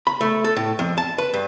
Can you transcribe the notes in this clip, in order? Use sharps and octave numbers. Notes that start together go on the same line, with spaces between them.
B5
A3
A4
A2
F2
A5
B4
G2